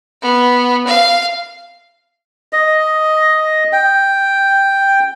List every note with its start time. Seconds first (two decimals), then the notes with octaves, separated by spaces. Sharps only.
0.22 B3
0.87 F5
2.53 D#5
3.73 G5